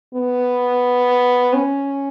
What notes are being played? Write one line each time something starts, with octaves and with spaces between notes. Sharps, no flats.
B3
C#4